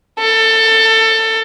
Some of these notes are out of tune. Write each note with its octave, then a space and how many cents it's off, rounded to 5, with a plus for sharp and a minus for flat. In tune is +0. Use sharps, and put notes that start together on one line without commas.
A4 +20